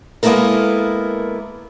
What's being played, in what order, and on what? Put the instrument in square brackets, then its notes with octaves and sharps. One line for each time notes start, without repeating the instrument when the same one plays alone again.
[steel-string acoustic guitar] G#3 A#3 B3 E4 A4 A#4